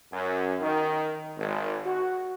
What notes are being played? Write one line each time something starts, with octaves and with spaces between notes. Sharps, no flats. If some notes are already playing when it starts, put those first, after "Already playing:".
F#2
D#3
G#1
F#4